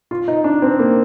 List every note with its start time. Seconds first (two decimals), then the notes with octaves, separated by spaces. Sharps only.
0.11 F4
0.28 D#4
0.44 D4
0.62 C4
0.79 A#3